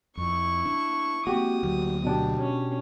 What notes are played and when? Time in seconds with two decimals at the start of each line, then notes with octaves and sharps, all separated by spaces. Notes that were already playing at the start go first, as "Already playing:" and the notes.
0.17 F2 E4 C#6
0.65 D4
1.27 A#3 C4 F#4 G4 D#6
1.63 D2 F#3 A#3
2.04 B2 D4 G4
2.38 C#4